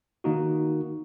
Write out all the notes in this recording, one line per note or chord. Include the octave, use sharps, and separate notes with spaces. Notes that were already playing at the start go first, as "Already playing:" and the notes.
D#3 A#3 D#4 F#4